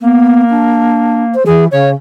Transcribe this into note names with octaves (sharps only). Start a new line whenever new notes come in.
A#3 B3
D4
C5
E3 G#4
C#3 C#5